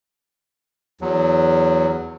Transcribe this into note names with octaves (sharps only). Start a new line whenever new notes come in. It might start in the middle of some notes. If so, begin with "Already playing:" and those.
E2 F#3